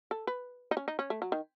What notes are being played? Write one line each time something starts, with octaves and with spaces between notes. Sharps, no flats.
A4
B4
D#4
C#4
D#4
C#4
A3
F#3
D#3